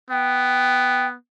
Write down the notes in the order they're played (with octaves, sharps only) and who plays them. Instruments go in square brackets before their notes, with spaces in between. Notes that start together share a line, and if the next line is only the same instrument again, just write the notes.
[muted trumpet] B3 [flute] G5